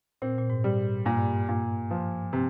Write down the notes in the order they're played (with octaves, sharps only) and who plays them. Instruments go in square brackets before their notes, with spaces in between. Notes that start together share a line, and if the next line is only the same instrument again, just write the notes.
[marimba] A#2 [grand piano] C4
[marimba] A#2
G#2
[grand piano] G3
[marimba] G2 [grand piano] A#2
[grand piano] A#2
F3
C3